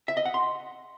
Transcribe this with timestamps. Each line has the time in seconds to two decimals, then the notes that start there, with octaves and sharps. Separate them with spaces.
0.08 E5
0.17 D#5
0.25 F#5
0.34 C6